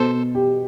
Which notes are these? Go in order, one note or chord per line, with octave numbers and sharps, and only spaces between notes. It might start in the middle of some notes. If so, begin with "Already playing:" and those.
Already playing: B2 A4 C5
G4